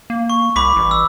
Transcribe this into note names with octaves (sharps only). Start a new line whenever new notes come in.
A#3
C#6
C2 B5 D6 B6
A1
E6